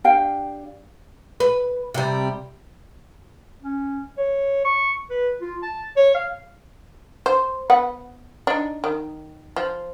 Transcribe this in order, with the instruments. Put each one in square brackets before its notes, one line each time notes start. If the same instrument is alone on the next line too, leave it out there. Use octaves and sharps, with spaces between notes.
[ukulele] D4 G4 F5 G5
[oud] B4
C3 G3
[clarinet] C#4
C#5
C#6
B4
F4
A5
C#5
F5
[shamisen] C5
B3 B4 F#5
D4 D#4
D#3
F3